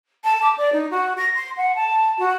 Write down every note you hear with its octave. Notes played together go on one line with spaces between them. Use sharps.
A5
D6
D5
D#4
F#4
A#6
C6
F#5
A5
F#4